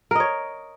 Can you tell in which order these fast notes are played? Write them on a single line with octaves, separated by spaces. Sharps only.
A#4 D#5 C#5